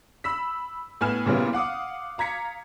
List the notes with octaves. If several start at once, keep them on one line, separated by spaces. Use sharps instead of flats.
B5 E6 B6
A2 B3 G#5 F6 E7
A#2 C#3 G3 B3 C#4 E4
F5 F#5 D6 D#6
F5 A#5 G#6 B6 C#7